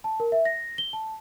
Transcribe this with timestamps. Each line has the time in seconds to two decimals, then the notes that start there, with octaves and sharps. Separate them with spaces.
0.04 A5
0.20 A#4
0.32 E5
0.45 A#6
0.78 G7
0.93 A5